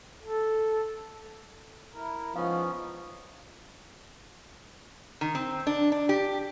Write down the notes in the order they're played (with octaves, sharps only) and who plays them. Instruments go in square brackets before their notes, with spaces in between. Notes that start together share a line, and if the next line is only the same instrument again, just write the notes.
[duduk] A4
[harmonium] E4 A#4
[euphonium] F3 [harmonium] G#3 D#4 [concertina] B3 C#4 [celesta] F5 C#6
[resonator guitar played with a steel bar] D#3
C4
D4
D4
G4